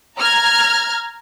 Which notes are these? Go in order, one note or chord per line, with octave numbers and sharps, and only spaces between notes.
A#5 F6 G#6